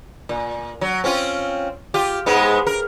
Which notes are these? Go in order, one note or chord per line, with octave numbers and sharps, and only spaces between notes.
A#2
F#3
C4 C#4 F4
F4 G4
G#2 G#3 B3
A#4